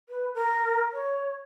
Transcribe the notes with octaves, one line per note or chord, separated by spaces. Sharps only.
B4
A#4
C#5